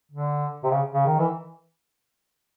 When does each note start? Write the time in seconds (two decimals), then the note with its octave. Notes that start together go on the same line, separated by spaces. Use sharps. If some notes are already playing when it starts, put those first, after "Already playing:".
0.12 D3
0.63 C3
0.71 C#3
0.94 C#3
1.06 D#3
1.19 E3